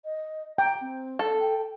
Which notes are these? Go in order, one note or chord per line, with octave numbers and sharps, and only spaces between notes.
D#5
G5 A#5
C4
A4
G5